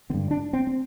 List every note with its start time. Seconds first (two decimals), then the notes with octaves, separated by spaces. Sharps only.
0.10 D3 C4
0.14 G2
0.31 D4
0.53 C4
0.67 C4